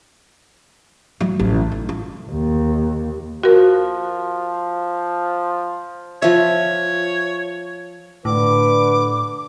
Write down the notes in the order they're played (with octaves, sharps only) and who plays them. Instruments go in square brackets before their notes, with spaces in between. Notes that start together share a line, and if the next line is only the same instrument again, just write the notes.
[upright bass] F#3
A1
D#4
F4
[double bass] D#2
[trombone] F3 [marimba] F#4 A#4
[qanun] F3 E5 [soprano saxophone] C#5
[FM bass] A2 [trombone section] D3 B4 [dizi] D6